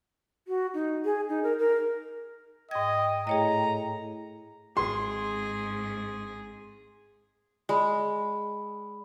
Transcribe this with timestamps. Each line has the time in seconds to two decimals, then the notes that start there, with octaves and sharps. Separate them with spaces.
0.48 F#4
0.74 D#4
1.05 G#4
1.29 D#4
1.43 A#4
1.59 A#4
2.71 G#2 D#5 G5 G#6
3.27 A2 G#4 C#5 D#5 A#5
4.77 G#1 G#2 C4 G#4 C6
7.69 G#3 D5 B5